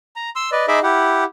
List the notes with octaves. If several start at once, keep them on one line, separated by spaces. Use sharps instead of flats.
A#5
C6 E6
B4 D5 D#5
D#4 G#4 D#5 E5 B5 D6
E4 G4 F#5